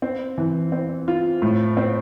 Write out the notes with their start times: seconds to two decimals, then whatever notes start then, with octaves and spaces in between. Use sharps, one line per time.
0.02 C4
0.38 E3
0.72 C4
1.08 F4
1.42 A2
1.77 C4